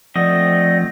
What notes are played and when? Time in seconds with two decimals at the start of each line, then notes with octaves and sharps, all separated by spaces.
0.16 F3 A3 C4 D5 D#5 F#5 A#6